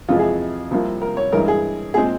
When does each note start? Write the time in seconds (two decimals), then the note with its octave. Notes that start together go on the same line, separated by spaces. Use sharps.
0.09 F2 C3 E3 G#3 F4
0.19 G#4
0.71 C2 C3 F3 A#3
1.02 A#4
1.17 C#5
1.32 G2 E3 G#3 A#4
1.48 G#4
1.94 A#2 G#3 C4 G#4